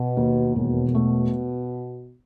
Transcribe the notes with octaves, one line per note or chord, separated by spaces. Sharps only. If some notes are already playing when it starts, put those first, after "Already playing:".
Already playing: B2
D#2
E1 B2
A3